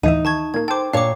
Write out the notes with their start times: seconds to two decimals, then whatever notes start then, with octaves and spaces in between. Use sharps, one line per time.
0.03 D2 A2 E3 D#4 E5 D#7
0.25 D#3 A5 C#6 G#6
0.54 A#2 A#3 G#6
0.68 A4 C5 G5 D6
0.93 A#2 D4 C#5 F5 D6